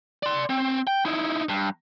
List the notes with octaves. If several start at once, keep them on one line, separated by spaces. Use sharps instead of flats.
D5 C6
C4
G5
D#4 E4
G2